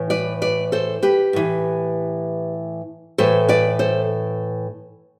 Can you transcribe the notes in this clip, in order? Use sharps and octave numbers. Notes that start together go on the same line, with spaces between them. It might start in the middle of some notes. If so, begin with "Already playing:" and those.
Already playing: A2 E3
B4 D5
B4 D5
A4 C5
G4 B4
A2 E3
A2 E3 A4 C5
B4 D5
A4 C5